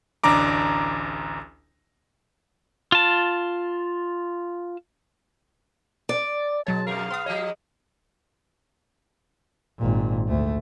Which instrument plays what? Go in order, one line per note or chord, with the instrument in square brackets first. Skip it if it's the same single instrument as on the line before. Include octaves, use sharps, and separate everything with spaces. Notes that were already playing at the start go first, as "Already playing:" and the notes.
[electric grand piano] A1 D2 D4 A#5 D6
[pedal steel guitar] F4 A5
[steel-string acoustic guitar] D5
[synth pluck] B2 F#3 C#5 [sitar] G#3 [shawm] A5
[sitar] F2 A#4 [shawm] F5
[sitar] B3 [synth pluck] C6 D#6
[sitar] F3 G#3 D#5 [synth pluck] C#5
[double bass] G#1 A#2
D2 A3